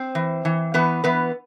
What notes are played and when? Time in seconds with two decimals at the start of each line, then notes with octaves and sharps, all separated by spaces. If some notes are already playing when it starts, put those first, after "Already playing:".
Already playing: C4 C5
0.15 E3
0.45 E3
0.74 E3 B3 B4
1.04 E3 B3 B4